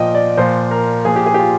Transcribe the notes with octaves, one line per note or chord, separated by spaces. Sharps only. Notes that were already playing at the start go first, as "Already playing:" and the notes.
Already playing: A#2 F3 D#5 G5
D5
A#2 F3 C5
A#4
A#2 F3 G#4
G4
G#4
G4
F4